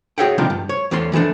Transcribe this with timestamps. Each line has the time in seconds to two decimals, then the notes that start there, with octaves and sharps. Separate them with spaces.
0.18 F#4 G#4 C#5 E5 F#5 G5
0.38 C3 D#3 F3 G3 D4 F4
0.50 G2
0.69 C#5
0.91 E2 E3 A3 C#4 C6
1.13 E3 F3 A3 D4